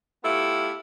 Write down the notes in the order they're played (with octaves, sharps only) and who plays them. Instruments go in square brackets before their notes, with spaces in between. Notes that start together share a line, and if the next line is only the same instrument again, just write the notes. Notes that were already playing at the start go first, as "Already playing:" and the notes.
[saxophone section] A3 B3 E4 F4 G4